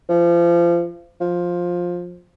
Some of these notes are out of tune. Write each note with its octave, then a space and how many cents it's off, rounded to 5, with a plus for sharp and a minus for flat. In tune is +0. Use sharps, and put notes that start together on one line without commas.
F3 -30
F3 +10